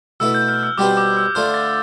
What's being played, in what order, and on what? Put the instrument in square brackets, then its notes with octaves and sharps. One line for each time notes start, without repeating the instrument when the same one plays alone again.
[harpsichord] B2 A3 E4 B4 [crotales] E6
[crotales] G6
F6
E6
[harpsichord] B2 G3 C4 G4 B4 [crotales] D6
[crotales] D6
E6
[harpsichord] D3 A3 D4 F4 C5 [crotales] F6
[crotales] A6